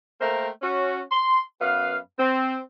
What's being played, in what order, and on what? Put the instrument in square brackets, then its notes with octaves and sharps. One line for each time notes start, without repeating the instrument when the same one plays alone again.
[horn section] A3 A#3 A#4 C5 G5 A#5
C#4 F#4
C6
F#2 B3 B4 F5
C4